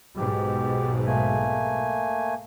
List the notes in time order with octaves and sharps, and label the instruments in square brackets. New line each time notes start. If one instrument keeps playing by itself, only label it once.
[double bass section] B1 G#2 B2 [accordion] G4
[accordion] A3 A#3 G#5